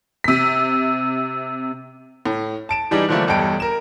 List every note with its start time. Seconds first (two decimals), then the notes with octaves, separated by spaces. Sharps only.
0.24 C3 B6
2.26 A2
2.69 A5 D7 E7
2.91 E3 G3 D4 D#4 G4 G#4
3.09 D3 E3 F3 G3 A3 A#3
3.27 B1 E2 G2 A4 G5 D7
3.60 A#4 E7